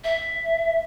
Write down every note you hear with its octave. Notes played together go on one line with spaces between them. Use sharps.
E5